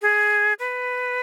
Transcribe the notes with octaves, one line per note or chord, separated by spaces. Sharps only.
G#4
B4